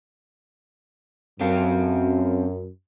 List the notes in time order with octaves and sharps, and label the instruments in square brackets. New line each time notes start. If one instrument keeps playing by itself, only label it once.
[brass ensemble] F#2 [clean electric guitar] C4 A4 F5